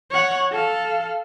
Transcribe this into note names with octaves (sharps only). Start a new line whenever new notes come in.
C#5 F#5
A4 F5